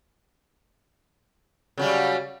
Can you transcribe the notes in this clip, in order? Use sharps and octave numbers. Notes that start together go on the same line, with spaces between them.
C#3 F#3 G3